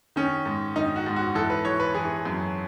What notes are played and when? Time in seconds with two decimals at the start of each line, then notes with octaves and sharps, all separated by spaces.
0.16 D#3 C#4
0.46 G#2
0.76 D#3 D#4
0.96 F#4
1.06 G#2
1.16 F#4
1.35 E3 A4
1.50 B4
1.65 E3 C#5
1.80 B4
1.95 E3 G#4
2.25 F#2